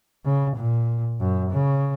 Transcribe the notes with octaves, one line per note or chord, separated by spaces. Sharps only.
C#3
A#2
F#2
C#3